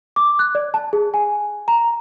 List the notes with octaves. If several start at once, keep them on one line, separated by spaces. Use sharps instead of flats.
D6
F#6
D5
A5
G#4
G#5
A#5